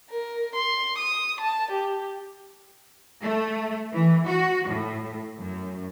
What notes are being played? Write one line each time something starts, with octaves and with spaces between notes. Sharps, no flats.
A#4
C6
D#6
A5
G4
A3
E3
F#4
A2
F#2